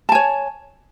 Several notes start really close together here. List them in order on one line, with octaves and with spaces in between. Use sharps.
A5 G#5 C#5